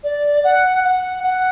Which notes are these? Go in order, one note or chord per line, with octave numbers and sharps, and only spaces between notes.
D5
F#5
F#5
F#5